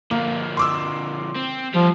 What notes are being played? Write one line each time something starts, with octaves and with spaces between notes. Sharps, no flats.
D3 F3 A#3
C6 D6 E6
C4
F3 G3 F4